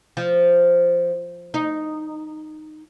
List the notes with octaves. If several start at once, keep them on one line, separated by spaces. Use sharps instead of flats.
F3
D#4